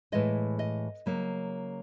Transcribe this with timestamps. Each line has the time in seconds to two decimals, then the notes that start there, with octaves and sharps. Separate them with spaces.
0.12 A2 E3 G#3 D#5
0.59 D#5
1.06 C#3 F#3 A#3